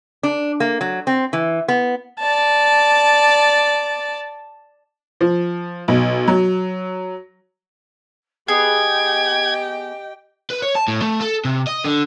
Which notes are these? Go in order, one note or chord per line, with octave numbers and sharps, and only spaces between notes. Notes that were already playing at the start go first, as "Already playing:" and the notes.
D4
A#3
F#3
C4
E3
B3
D5 A5
F3
B1
F#3
B3 G4 G#4 D#5 G5 G#6
B4
C#5
A5
A2
A3
A4
C3
D#5
D3